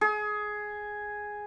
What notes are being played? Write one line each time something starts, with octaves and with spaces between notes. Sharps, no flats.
G#4